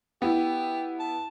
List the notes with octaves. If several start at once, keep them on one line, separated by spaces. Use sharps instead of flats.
B3 E4 G4
A5